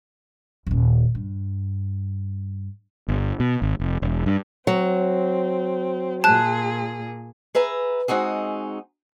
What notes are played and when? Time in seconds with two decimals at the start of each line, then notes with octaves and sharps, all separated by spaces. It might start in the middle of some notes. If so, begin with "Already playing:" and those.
0.67 D#1 G#1
1.15 G2
3.08 G1
3.40 B2
3.62 G#1
3.80 F1
4.02 E1
4.26 G2
4.67 F#3 C4
6.24 A#2 G#4 A5 F#6
7.55 G#4 B4 E5 A#5
8.08 G#3 C4 D#4 F#4 G#4